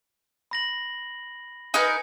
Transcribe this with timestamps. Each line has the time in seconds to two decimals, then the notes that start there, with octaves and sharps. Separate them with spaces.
0.51 B5 A#6 F#7
1.74 D#4 A#4 B4 G#5 G#6 C#7